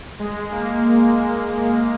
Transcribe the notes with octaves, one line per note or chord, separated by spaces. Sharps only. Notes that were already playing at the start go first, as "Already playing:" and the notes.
G#3
A#3